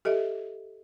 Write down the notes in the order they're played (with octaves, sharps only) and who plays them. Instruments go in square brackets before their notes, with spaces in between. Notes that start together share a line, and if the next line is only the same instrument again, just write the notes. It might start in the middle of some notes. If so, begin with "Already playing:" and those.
[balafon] G4 A4 D#5 E5